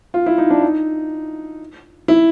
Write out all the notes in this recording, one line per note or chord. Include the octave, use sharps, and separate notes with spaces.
F4
E4
D#4
D4
D#4
E4